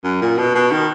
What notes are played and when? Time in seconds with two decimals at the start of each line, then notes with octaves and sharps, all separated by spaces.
0.04 F#2
0.21 A#2
0.37 B2
0.55 B2
0.71 D#3